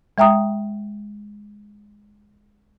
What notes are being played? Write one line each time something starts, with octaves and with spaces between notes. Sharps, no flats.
G#3 E5 G5 A#5 D#6